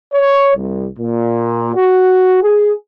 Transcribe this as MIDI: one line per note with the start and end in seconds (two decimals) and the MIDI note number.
0.14 0.53 73
0.55 0.86 36
0.98 1.71 46
1.76 2.42 66
2.43 2.71 68